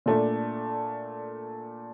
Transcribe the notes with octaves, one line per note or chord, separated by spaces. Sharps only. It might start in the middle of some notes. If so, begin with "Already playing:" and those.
A#2 A3 D4